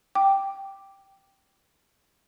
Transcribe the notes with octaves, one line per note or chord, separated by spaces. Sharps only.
G5 D6